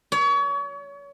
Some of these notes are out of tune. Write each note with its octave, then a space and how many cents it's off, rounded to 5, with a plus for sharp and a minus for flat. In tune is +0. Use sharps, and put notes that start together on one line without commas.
C#5 +35